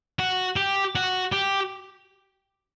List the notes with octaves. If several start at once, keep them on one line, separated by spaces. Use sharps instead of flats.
F#4
G4
F#4
G4